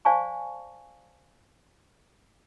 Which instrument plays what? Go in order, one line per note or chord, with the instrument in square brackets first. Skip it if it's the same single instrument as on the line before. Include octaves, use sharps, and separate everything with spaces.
[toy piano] C5 D5 F5 G#5 A5 C#6